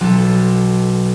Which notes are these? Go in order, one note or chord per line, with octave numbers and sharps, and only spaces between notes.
B1 A4